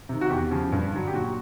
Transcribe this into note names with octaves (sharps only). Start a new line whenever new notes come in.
C3 D#3
F#4
E2 G4
C#3 F3
G2
D3 F#3
G4
A#2 F#4